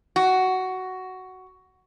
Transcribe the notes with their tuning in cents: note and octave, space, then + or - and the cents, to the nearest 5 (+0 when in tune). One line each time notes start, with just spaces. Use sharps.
F#4 +10